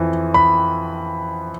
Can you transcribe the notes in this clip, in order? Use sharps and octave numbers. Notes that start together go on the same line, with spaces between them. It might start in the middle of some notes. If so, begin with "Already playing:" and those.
Already playing: F2 E3
B5